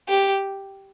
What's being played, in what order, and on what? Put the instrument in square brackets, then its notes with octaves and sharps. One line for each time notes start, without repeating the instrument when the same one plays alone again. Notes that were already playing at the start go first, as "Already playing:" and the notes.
[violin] G4